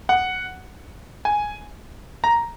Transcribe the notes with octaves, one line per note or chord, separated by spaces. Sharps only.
F#5
G#5
A#5